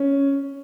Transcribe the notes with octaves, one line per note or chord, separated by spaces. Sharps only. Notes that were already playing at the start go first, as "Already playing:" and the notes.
Already playing: C#4